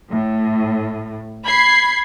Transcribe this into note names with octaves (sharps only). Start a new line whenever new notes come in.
A2
B5 G#6 C7